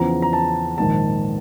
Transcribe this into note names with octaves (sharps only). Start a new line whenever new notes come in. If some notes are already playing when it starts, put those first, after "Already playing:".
Already playing: E2 C#3 F3 A#5
A#5
A5
A#1 G#2 D#3 A5